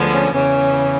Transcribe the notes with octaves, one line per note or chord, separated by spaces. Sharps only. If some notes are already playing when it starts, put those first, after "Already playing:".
Already playing: D2 D3 F3 G#3 B3
C#4
E2 C#3 E3 C#4